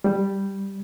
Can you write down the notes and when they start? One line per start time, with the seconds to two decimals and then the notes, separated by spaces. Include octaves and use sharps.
0.04 G3